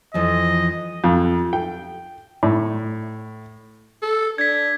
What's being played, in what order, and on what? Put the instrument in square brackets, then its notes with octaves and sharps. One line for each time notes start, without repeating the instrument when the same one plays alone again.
[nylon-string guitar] F2 E3 F3 [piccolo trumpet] D#5
[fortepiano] F2
G5
A2
[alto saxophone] A4
[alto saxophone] D4 [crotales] G#6 B6